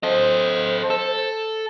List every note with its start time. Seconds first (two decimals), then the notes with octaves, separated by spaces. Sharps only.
0.03 A4 C5 D#5
0.90 A4